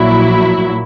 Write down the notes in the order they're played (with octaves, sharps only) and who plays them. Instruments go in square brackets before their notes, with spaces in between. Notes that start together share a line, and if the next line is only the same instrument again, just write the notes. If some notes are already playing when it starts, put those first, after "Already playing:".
Already playing: [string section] A#1 A#2 F#3 E4